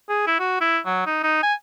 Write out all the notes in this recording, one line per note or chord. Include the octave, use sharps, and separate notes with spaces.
G#4
E4
F#4
E4
F#3
D#4
D#4
G#5